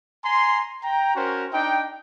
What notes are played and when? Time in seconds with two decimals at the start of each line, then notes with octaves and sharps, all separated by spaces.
0.24 G#5 A#5 C6
0.84 G5 A#5
1.14 C#4 F#4 A#4 C5
1.53 D4 D#4 G5